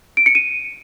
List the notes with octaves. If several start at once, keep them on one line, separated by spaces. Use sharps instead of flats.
D7
C#7
D#7